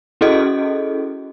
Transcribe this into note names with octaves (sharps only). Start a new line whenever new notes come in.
C#4 E4 F#4 G#4 A4 D#5